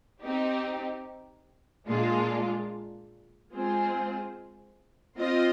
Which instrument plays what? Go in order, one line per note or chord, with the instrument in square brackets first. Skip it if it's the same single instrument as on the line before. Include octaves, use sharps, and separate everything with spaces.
[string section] C4 D#4 G4
A#2 G#3 D4 F4
G#3 C4 F4 G#4 C5
C4 F4 C5 D#5